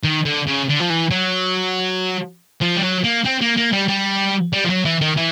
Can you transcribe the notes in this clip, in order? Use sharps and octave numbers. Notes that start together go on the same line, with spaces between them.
D#3
D3
C#3
D3
F3
E3
F#3
F3
G3
F#3
A#3
C4
A#3
A#3
G3
G3
G3
F3
F#3
E3
D#3
E3